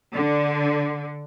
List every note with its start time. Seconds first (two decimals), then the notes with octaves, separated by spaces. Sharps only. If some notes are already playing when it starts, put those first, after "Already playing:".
0.13 D3